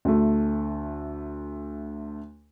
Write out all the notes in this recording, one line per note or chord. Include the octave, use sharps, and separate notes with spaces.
D2 A3